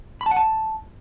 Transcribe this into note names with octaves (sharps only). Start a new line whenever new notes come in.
B5
A5
F#5
A5